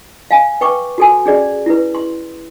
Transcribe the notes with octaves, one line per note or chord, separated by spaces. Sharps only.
F5 G#5
B4 G5 C#6 D6
F#4 A4 G#5
C#4 G#4 D5
E4 B4
C6